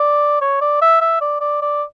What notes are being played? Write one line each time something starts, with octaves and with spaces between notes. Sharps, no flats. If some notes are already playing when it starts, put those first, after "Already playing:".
Already playing: D5
C#5
D5
E5
E5
D5
D5
D5